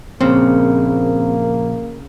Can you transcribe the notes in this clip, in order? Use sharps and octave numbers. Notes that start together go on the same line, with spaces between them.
A#1 C#3 A#3 C4